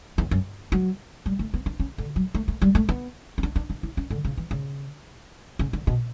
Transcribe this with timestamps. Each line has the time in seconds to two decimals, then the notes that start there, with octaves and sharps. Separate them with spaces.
0.18 E2
0.31 F#2
0.72 F#3
1.26 G3
1.39 A3
1.54 B3
1.66 D4
1.80 C#4
1.98 D3
2.16 F#3
2.35 A3
2.48 A3
2.62 G3
2.75 A3
2.89 B3
3.38 C#4
3.43 D4
3.56 D4
3.70 D4
3.83 E4
3.97 C#4
4.10 D3
4.25 C#3
4.37 E3
4.51 C#3
5.59 C#3
5.73 D3
5.87 B2